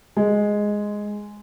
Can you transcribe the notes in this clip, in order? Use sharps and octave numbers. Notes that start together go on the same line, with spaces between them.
G#3